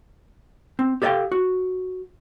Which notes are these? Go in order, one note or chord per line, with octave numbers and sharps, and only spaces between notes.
C4
G4 A4 D5 E5 F5 G5
F#4